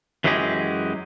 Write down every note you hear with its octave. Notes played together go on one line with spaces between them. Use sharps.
F#2 E3 F#3 G#3 G4 G#4